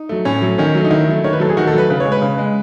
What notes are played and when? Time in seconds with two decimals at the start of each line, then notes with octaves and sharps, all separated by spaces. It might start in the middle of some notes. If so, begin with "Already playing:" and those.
Already playing: D#4
0.09 F#3 A3
0.25 A2 C#4
0.42 F#3 A3
0.58 D#3 C#4
0.75 F#3 A3
0.84 D#4
0.91 D#3 E4
1.08 F#3 A3
1.24 D#3 C#5
1.33 B4
1.40 F#3 A3 A4
1.49 G#4
1.57 D#3 F#4
1.67 A4
1.74 F#3 A3 B4
1.90 C#3 B4
2.00 C#5
2.05 G#3
2.12 B4
2.22 C#3
2.38 G#3